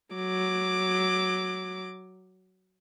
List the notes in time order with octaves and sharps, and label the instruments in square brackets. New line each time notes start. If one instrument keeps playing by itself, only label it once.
[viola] F#3 D6